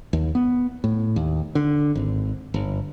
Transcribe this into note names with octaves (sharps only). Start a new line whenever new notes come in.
D#2
B3
A2
D#2
D3
G#1
G1